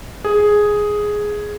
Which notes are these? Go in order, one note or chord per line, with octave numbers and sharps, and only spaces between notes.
G#4